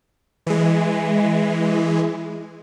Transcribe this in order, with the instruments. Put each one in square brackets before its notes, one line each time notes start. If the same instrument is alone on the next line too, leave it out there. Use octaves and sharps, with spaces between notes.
[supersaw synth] E3 G#3